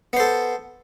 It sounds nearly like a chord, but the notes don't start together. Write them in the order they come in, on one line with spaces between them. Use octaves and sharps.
B3 C5 A4